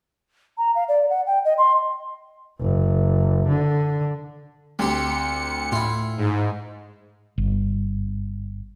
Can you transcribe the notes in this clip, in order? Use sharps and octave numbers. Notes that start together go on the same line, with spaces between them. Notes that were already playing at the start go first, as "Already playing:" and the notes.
A#5
F5
D5
F#5
G5
D#5
C6
F#1
D3
D2 C4 G4 C#7
A2 E4 F4
G#2
G1